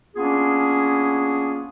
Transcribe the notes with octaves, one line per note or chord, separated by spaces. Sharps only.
A#3 B3 C#4 D4 F4 G#4